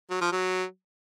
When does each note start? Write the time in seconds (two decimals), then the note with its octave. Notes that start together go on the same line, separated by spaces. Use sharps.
0.10 F#3
0.21 F3
0.32 F#3